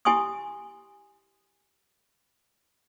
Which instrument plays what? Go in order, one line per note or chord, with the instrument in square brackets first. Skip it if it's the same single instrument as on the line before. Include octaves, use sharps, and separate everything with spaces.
[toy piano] E4 G4 G#5 C6 C#6 D#6